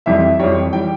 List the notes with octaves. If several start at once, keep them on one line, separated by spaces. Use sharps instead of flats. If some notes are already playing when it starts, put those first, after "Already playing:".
F2 E3 G3 E5
F2 E3 G3 C#5
E3 G3 G5